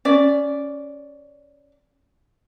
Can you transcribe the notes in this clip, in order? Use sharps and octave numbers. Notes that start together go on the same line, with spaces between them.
C#4 D5